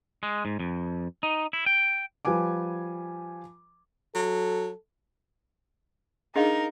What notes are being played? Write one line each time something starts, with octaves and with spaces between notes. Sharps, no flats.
G#3
G#2
F2
D#4
E4
G5
F3 G3 B4 G#5 D6
F#3 A4
D4 D#4 G#4 A#4 D#5 F5